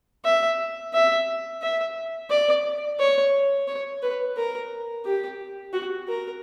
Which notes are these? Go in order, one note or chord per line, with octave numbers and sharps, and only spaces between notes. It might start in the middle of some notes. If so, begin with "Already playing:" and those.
E5
E5
E5
D5
C#5
C#5
B4
A#4
G4
F#4
A#4